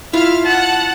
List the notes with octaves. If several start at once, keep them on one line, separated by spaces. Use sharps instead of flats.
E4 F4 E5 F5 F6
F#5 A5